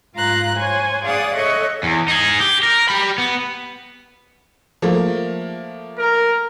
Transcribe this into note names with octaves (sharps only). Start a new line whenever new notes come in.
G#2 F4 F5 A#5 F#6
C5 C#5 G#5
G#4 D5 F5 F#5 D#6
A4 C#5 D#5 E5 C#6 F#6
E2
D#4 G#4
G4
A#4
G4 B5
B3
F3 A3 A#3
A#4